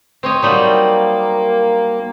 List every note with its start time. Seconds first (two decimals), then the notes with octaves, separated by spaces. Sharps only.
0.23 C4 C#5 D#5
0.42 F#3 G3 A#3 D#4